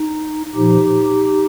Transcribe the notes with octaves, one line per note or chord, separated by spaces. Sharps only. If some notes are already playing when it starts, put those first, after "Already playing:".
Already playing: D#4
A#2 F3 D#4 G4